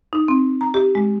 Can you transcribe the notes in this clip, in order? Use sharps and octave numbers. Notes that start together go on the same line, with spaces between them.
D#4
C4
A#5
G4
G#3